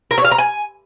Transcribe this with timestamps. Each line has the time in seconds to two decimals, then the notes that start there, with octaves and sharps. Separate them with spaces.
0.11 A#4
0.18 C#5
0.25 F5
0.32 A#5
0.38 G#5